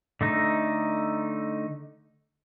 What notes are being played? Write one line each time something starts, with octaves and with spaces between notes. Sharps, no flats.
D3 A3 D#4